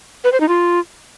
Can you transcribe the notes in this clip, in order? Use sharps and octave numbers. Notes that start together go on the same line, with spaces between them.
B4
C5
D#4
F4